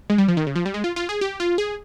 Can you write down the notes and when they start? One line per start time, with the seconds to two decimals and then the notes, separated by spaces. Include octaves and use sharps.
0.10 G#3
0.18 G3
0.28 F3
0.37 D#3
0.47 C#3
0.56 F3
0.66 G3
0.74 G#3
0.84 F4
0.96 F4
1.09 G#4
1.21 G4
1.40 F4
1.58 G#4